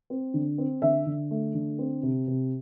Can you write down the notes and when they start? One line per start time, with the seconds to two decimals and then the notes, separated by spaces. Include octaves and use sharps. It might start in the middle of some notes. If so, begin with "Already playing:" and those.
0.10 C4
0.34 D3
0.58 C4
0.82 D3 E5
1.06 D3
1.31 A3
1.54 D3
1.79 C4
2.03 C3
2.27 C3